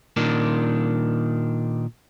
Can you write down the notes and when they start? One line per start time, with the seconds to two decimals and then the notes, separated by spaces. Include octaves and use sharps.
0.17 A#2 D#3 D4